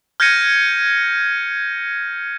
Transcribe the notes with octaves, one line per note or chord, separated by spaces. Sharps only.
F6 G6 G#6 A#6 C#7 D#7